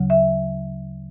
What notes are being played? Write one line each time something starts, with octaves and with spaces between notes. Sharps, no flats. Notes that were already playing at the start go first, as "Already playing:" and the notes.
Already playing: D2 C#3 F#3
E5